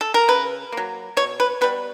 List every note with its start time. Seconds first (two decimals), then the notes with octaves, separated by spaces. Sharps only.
0.01 A4
0.14 A#4
0.28 C#3 B4
0.72 F#3 A#3
1.17 B2 C#5
1.40 B4
1.61 G3 B3 B4